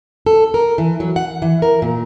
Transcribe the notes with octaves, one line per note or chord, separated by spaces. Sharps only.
A4
A#4
E3
F#3
F#5
E3
A#4
A#2